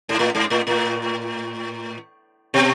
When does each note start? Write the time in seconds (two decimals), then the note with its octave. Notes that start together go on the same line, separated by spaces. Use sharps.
0.09 G#2
0.19 A2
0.35 G#2
0.50 A2
0.67 A2
2.54 B2